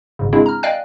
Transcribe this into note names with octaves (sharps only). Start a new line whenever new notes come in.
G#1 G#2 C#3
G#3 A#3 C4 D4 E4 G#4
A#5 F6
D5 D#5 F5 G5 G#5 F#6